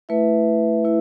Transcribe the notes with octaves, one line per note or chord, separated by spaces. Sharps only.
A3 E4 B4 E5
A3 E4 B4